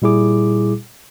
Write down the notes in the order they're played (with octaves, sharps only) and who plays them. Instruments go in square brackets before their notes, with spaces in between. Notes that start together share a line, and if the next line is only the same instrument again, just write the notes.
[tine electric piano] A#2 G3 E4 G#4 D6